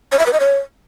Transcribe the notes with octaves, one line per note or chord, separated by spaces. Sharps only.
C#5
E5
B4
D#5
C#5